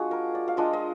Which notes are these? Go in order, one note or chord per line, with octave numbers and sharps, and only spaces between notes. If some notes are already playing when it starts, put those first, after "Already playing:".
Already playing: G#3 D4 F4 F#4 G#4
A#4
D5
F5
G#3 D4 F4 D#5
D#5